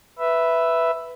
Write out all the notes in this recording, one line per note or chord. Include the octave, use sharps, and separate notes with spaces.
B4 E5